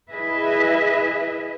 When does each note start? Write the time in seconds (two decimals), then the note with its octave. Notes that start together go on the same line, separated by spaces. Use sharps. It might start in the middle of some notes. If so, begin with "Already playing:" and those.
0.11 E4 G#4 B4 D#5 E5